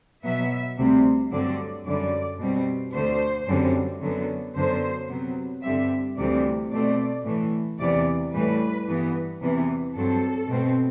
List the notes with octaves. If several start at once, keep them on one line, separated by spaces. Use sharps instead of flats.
B2 F#3 B3 E5
D2 C3 G3 C4
G2 D3 F#3 C4 D5
F#2 D3 G3 D5
B2 G3 C4
D2 D3 A3 C5
F#2 D3 G3 C4
F#2 D3 F#3 B3
F#2 D3 F#3 B3 C5
C3 F#3 B3
G2 D3 G3 C4 E5
D2 C3 E3 G3 C4 D5
B2 A3 C4 D5
A2 E3 A3
E2 C3 E3 B3 D5
A2 E3 G3 B4
G2 E3 B3
E2 C3 E3 B3
G2 F#3 C4 A4
B2 A3 C4